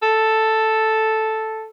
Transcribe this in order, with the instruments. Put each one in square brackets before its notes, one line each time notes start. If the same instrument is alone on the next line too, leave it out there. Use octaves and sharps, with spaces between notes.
[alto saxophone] A4